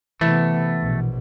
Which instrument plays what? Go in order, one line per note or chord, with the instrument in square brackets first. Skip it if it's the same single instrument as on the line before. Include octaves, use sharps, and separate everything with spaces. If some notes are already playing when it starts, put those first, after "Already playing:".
[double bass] C3 B3 [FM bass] E3 [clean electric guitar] A3
[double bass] A#1 B2